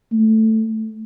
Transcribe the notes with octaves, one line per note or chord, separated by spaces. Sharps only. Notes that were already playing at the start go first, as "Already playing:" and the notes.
A3